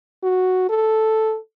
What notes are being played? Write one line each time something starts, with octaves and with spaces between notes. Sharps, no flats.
F#4
A4